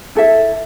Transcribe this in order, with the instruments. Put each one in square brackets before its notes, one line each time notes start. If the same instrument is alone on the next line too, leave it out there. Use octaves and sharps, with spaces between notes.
[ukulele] E4 A4 E5